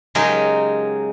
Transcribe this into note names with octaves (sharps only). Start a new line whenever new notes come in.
C#3 F#3 G#3 D#4 G4 A#4